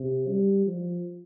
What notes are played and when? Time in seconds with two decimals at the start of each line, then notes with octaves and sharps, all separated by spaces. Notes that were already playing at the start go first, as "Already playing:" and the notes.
Already playing: C3
0.29 G3
0.67 F3